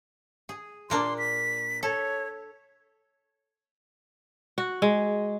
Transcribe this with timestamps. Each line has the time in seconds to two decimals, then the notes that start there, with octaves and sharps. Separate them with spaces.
0.49 G#4
0.90 A#2 A#3 D4 C6
1.18 B6
1.83 A4 C#5
4.58 F#4
4.82 G#3